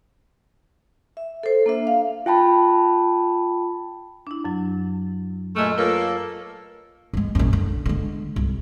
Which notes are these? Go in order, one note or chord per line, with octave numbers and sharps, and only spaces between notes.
E5
A4 C5
A#3 D4 E5
F5
F4 G5 A5 B5
D4 E4
F#2 F#3
A#2 G#3 A3 D#5 F6
A#3 F4 A4 B4 C#5
E3 G#3
A#1 F#2
D3
D3 G#3
C2